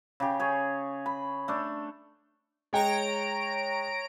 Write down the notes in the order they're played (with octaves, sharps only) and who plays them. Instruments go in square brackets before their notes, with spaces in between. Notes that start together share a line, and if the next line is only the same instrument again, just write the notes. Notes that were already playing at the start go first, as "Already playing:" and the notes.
[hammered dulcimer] C#3 G4
G#4 C#5
B5
A3 D4
[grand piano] G#3 G5 [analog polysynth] C#5 A#5 D7